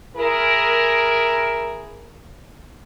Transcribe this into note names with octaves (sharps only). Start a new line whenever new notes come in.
E4 G#4 A#4